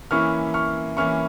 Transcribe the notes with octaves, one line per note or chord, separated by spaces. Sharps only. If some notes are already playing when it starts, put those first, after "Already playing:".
E3 A#3 C#4 E4 C#6 F6
C#6 F6
E3 A#3 C#4 E4 C#6 F6